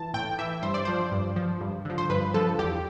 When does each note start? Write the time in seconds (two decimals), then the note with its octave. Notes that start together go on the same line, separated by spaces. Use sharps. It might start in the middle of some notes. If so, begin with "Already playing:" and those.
Already playing: E3 A5
0.14 A2 G5
0.38 E3 E5
0.63 G2 C5
0.74 D5
0.85 F3 C5
1.12 G2
1.36 F3
1.61 G2
1.85 D3 F3
1.98 C5
2.10 G2 B4
2.34 D3 F3 A4
2.58 E2 G4